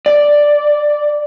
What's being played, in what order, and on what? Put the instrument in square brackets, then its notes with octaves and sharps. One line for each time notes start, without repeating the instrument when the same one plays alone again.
[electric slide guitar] D5